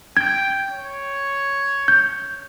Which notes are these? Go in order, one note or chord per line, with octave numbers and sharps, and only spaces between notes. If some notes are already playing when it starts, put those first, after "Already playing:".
G5 G#6
C#5
G6